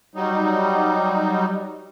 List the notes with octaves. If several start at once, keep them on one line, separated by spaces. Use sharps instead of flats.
F#3 G3 D#4